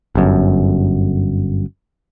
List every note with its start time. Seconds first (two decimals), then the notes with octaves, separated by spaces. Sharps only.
0.15 G1 F#2